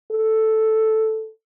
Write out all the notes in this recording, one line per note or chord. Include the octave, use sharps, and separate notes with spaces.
A4